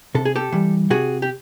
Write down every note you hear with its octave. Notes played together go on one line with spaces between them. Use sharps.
C3 A4
G#4
G4 A4
E3 G3
C3 F#4 G#4
G4